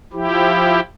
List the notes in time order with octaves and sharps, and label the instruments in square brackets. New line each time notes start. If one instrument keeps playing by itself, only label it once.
[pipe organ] F3 E4 G4